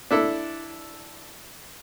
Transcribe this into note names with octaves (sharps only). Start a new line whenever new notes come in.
D4 E4 A4